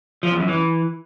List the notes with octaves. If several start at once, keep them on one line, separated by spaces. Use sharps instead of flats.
F3
E2
F#2
E3